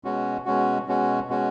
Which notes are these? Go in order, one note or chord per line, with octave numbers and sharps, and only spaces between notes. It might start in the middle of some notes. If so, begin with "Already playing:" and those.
B2 G#3 C#4 F#4
B2 G#3 C#4 F#4
B2 G#3 C#4 F#4
B2 G#3 C#4 F#4